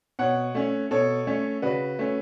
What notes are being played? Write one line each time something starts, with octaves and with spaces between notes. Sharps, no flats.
B2 C#5 F#5
A3 C#4
B2 A4 C#5
A3 C#4
C#3 F#4 B4
A3 C#4